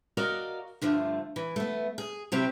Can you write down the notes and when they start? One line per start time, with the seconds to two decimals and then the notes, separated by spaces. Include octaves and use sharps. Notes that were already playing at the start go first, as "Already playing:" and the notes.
0.17 F#4 A#4 D5 D#5 F5
0.81 G2 D3 F3 A3
1.36 E3
1.56 A3 B3
1.98 G#4
2.32 C3 F#3 C4 E4 G4